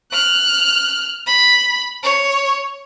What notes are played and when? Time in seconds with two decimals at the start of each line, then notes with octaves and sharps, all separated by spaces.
0.12 F6 F#6
1.27 B5
2.03 C#5